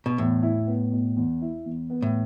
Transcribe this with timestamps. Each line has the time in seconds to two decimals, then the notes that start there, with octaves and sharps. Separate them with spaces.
0.06 B2
0.18 E2 A2
0.43 E4
0.67 B3
0.92 B2
1.16 E2
1.42 E4
1.66 E2
1.90 B3
2.02 A2